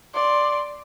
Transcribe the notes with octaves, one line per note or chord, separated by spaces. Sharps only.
D5 C6